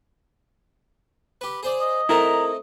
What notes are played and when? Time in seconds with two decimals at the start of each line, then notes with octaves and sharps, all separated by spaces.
1.41 G4 B4
1.63 G#4 C5 D5
1.81 D#5
2.09 A3 C4 D#4 E4 A#4 A#5